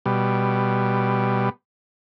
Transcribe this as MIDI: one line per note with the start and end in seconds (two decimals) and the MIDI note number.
0.06 1.49 47
0.06 1.49 55